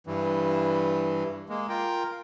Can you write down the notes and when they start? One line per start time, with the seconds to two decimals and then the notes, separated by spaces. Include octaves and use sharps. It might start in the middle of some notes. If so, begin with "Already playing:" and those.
0.07 G2 E3
1.49 G#3 A#3
1.69 F4 A#4 G5